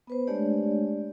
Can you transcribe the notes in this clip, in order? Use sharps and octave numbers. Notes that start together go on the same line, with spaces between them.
B3 B4 C5
G#3 A3 D4 G4 C#5 D5